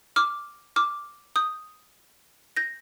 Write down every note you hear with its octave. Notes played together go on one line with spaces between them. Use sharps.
D6 F6
D6 F6
D#6 G6
G6 A#6